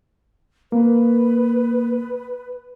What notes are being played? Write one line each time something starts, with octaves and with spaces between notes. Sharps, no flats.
A#3 B4